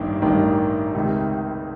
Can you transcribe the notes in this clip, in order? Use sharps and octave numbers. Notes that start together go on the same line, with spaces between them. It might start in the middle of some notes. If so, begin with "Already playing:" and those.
Already playing: A1 G2 D#3 A#3
A1 G2 D#3
C#2 C3 D#3